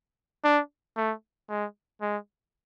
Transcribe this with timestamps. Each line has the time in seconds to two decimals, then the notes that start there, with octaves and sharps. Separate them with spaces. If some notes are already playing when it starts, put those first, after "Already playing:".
0.44 D4
0.97 A3
1.49 G#3
2.01 G#3